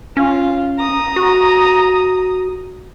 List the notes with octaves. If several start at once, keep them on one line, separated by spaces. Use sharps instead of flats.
C#4 F4
A#5 D#6
F#4